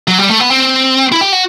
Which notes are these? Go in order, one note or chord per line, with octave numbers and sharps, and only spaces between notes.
F#3
G3
A3
B3
C4
E4
G4
F#4